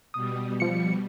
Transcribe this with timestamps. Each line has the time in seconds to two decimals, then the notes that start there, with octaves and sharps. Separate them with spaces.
0.14 B2 G3 D#6
0.60 F3 C#7